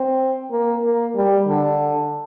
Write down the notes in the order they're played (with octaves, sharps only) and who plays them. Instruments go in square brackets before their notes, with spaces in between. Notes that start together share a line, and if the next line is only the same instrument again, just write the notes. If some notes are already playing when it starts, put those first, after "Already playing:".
Already playing: [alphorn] C4
A#3
A#3
G3
D3